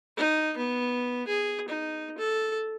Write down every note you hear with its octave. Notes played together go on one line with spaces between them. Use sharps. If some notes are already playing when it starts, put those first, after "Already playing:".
D#4
B3
G#4
D#4
A4